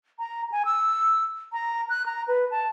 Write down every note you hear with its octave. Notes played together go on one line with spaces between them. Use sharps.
A#5
G#5
E6
A#5
F#6
A#5
B4
A5